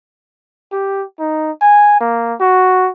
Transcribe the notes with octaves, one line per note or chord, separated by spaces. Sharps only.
G4
D#4
G#5
A#3
F#4